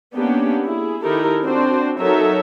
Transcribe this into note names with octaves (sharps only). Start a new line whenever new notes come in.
A#3 B3 C#4 D4 G4
E4 G#4
D#3 D#4 E4 G4 A4 A#4
C4 D4 F#4 C5
F#3 D#4 A4 A#4 C#5 E5